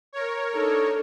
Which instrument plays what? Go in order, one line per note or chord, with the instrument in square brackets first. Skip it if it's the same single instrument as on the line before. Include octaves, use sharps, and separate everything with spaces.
[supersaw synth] A#4 C#5
[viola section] D4 D#4 A4